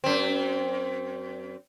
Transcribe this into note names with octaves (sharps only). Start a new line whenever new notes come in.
F#2 C4